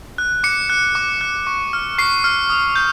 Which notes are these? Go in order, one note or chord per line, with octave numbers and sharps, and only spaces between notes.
F#6
D6 C#7
F#6
D6
F#6
C#6
F6
C#6 C7
F6
D#6
G6